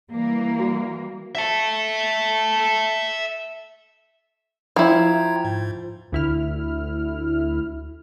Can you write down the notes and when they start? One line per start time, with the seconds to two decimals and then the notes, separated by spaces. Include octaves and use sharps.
0.11 E3 G3 A#3
0.60 F#4
1.35 E5 A5
4.76 F3 E4 G5 A#5 G#6
5.45 G#2
6.12 D2 E4 F6